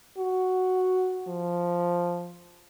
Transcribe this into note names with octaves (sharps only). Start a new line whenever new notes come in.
F#4
F3